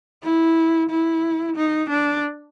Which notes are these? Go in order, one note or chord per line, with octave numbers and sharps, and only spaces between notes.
E4
E4
D#4
D4